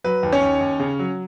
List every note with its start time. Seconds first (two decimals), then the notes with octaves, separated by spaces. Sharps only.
0.04 F#3 B4
0.23 D#2
0.32 C#4 C#5
0.42 D#2
0.61 D#2
0.80 C#3
0.99 F#3